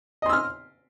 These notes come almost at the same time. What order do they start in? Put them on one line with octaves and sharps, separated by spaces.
D#5 C6 E6 F6